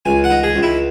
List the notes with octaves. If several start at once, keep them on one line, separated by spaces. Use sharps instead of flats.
C#2 G#5
F#5
D#4
G#4
C#2
E4